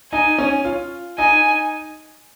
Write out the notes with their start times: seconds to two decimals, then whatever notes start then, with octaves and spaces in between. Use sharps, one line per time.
0.12 D#4 G#5
0.38 C#4
0.65 F4
1.18 D#4 G#5